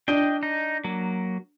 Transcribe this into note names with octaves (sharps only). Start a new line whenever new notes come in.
D4 D#5 G5
D#4
F#3 A#3